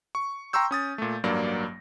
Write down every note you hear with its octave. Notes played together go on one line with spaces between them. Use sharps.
C#6
G5 A#5 C6 C#6 E6 G6
C#4 D#6 A6
A#2 A3
A1 G2 F#3 A#3 D5 A#6